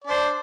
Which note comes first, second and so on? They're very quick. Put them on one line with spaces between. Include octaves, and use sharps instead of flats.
D5 D4 C5